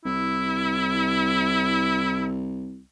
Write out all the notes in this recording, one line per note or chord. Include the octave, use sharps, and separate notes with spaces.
C2 E4